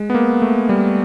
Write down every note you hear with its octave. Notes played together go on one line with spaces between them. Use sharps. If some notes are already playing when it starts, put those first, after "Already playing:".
Already playing: G#3
B3
A#3
A3
G3